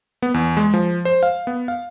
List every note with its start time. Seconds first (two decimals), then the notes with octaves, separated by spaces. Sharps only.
0.22 B3
0.34 E2
0.57 G#3
0.74 F3
1.05 C5
1.23 F5
1.47 B3
1.68 F5